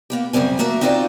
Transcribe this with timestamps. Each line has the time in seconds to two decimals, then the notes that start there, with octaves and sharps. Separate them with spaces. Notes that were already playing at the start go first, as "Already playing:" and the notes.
0.10 A#3 B3 G4
0.33 F#2 C#3 G3 C4 G#5
0.59 A3 A#3 F#4 A#4 E5
0.81 C4 D#4 F4 F#4 C5 D5